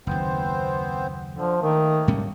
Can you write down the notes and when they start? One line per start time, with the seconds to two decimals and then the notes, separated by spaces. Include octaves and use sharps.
0.07 F#1 D#2 B3 C4 C5
1.35 D3 F3
1.62 D#3 A3 A#3
2.08 G#2 G3 C#4